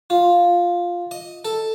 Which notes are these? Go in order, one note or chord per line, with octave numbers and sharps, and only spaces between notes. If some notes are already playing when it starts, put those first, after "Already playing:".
F4
D#5
A4